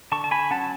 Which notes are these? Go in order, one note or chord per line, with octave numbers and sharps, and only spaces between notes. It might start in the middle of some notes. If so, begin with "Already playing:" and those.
D3 A5 C#6
A5
G#5 B5
F#3 C#4 F#5 A5